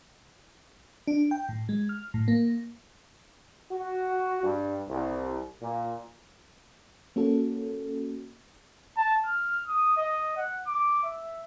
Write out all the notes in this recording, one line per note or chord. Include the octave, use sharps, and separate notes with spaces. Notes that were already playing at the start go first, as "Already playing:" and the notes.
D4
G5
A2
G#3
F6
A2
A#3
F#4
G2
C2
A#2
A#3 C#4 F#4 A4
A5
F6
D#6
D#5
F#5
D6
E5